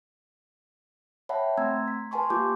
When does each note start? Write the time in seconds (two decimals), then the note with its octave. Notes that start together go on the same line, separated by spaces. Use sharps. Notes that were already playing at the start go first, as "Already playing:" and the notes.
1.29 C#5 E5 F#5 G5 A5 B5
1.58 A3 C4 A#5 C6 E6 G#6
1.88 B6
2.11 B4 F#5 G#5 A5 C6 C#6
2.30 A#3 F4 G4 D6 G6